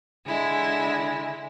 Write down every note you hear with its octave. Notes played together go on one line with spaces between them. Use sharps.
D3 G#3 E4